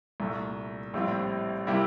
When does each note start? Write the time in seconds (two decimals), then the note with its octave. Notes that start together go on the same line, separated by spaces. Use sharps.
0.20 C2 A#2 A3
0.94 A#1 A2 G3 C4 F4
1.67 C3 G3 A#3 E4